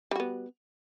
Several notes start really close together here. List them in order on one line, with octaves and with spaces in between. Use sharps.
G3 F#4 B3